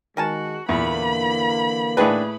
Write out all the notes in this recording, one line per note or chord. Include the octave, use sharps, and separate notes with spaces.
D#3 G#3 F#4 A#4 G#5 A5
E2 A#2 D3 E3 A#3 B5
A2 D#3 D4 G#4 B4